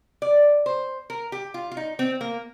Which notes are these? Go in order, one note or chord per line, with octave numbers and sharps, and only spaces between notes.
D5
C5
A#4
G4
F4
F4
D#4
C4
A#3